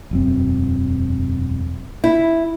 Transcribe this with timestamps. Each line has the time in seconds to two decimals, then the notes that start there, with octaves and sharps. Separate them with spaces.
0.11 E1 F#2 C4
2.04 E4